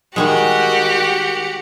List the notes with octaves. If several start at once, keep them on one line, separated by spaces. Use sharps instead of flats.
D#3 G3 G#3 F#4 G4 F#5